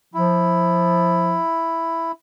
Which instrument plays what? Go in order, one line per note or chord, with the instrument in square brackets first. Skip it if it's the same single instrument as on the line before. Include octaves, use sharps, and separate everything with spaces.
[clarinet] F3 [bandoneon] E4